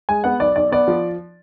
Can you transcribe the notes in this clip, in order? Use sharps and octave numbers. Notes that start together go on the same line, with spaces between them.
G#3 G#5
B3 F#5
B1 D5
B1 D5
B3 D5
F3